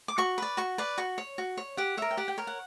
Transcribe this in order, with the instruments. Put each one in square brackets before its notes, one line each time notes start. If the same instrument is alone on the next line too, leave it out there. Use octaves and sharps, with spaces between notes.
[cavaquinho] D6
F#4 C#6
B4 D5
F#4 C#6
B4 D5
F#4 C#6
C#5
F#4
C#5
G4 F#5
A#4 C#5 E5
G5
G4 F#5
G5
A#4 C#5
F#5